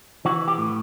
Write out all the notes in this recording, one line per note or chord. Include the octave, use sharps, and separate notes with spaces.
E3 F#4
G4
A2